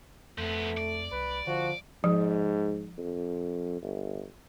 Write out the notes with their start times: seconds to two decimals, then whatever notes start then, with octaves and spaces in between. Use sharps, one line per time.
0.38 F2 F3 A3 B3
0.77 D5
1.12 C2 B4
1.46 D3 F3 F#4
2.04 G#2 F3
2.98 F2
3.82 G1